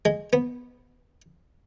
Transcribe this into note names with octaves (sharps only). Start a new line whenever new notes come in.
G#3
B3